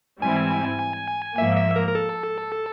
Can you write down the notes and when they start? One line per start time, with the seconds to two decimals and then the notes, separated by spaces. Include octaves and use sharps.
0.22 G#2 E3 G3 C4 E4 G#5
1.37 G#2 F3 A#3 E5
1.57 E5
1.76 A#4
1.88 A#4
1.95 A4